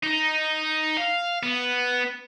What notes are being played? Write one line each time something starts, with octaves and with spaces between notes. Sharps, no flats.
D#4
F5
B3